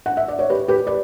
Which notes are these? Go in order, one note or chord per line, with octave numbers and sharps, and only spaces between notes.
F#5
E5
D5
C#5
G4 B4
G4 B4
B4 D5